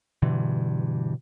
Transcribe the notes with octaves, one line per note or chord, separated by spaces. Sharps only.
G2 B2 D3 E3